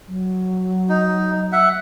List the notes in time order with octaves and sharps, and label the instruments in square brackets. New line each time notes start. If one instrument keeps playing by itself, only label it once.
[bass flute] F#3
[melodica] D#4
E5 F#5